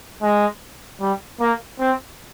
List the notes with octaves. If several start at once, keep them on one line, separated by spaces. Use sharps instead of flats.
G#3
G3
A#3
C4